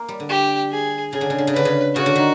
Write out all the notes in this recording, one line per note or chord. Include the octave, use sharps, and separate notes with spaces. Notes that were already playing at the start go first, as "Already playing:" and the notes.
Already playing: A#3
G3
D3
G4
G#4
C#3 G#4
D3
C#3
D3
C#3
D3 B4
C#3
C#3 F#4
D3
D#3